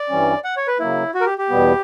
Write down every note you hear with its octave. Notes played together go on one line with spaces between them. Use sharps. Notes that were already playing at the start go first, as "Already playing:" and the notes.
Already playing: D5
G2 E3 G3 C#4
F#5
C#5
B4
C#3 F#3 A#3 E4
F#4
A#4
G4
G4
E2 B2 G3 B3